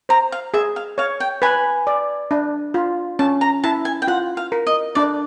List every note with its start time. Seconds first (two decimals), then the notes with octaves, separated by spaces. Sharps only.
0.09 C5 A#5
0.32 F5
0.54 G#4 E5
0.76 F5
0.98 C#5 F5
1.20 G5
1.42 B4 G#5
1.87 D5
2.31 D4
2.74 F4
3.19 C#4 A5
3.41 A#5
3.64 E4 A5
3.85 G#5
4.02 G5
4.08 F4 F#5
4.37 F5
4.52 A#4
4.67 D#5
4.95 D4 D5